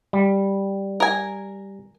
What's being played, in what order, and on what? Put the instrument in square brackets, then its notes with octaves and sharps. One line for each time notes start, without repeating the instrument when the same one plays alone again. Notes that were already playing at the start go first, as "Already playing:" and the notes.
[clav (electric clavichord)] G3
[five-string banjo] A#4 G#5